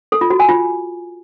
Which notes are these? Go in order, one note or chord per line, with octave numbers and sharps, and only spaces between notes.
A4
F4
F#4
G#5
F4